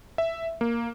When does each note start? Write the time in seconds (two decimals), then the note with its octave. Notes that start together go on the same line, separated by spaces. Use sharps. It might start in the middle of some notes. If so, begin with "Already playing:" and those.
0.18 E5
0.61 A#3